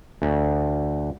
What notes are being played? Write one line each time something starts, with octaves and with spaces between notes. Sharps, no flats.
D2